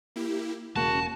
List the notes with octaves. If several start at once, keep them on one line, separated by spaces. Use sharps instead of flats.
A#3 E4 G4
E1 C#3 A#3 F#4 A5